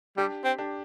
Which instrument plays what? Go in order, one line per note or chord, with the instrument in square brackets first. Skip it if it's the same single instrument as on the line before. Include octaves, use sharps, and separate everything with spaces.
[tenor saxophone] G3 [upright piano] D4 G4
[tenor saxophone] C4
[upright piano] D4 G4